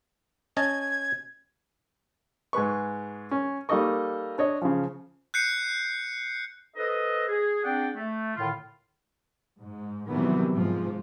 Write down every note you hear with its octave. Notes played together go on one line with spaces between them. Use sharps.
C#4 D#5 A5 G#6
G#2 G#4 B4 C#6
C#4
G3 A#3 D#4 A4 D#5 C#6
D4 C#5 D#5
C#3 F3
F#6 G6 C7 C#7
A4 B4 C5 D#5
G#4
C4 D4 G#4 D5 F#5 G5
A3
A2 D3 D#3 F4
G#2
C3 D#3 E3 F#3 G3 B3
G#2 F3 G#3